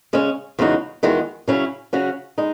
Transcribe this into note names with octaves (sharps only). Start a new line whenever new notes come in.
C#3 G#3 C#4
E2 C#3 G#3 D#4 F#4
E2 D#3 G#3 D#4 F#4
C#3 F#3 C#4 E4
C#3 F#3 C#4 F#4
G#3 D#4